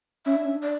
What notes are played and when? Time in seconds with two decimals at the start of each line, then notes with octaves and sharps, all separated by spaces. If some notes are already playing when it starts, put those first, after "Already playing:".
0.26 C#4 E5
0.35 D4
0.45 C#4
0.56 D4
0.63 D5